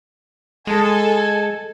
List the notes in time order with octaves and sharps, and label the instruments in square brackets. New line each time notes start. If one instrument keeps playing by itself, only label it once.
[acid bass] G#3 [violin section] A4 [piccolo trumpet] G#5